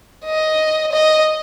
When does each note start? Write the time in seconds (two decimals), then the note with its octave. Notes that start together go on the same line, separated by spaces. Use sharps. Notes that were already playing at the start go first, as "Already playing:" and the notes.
0.26 D#5
0.92 D#5